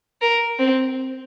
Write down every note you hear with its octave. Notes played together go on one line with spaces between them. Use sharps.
A#4
C4